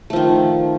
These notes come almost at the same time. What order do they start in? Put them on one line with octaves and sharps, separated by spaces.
A3 F3 D#3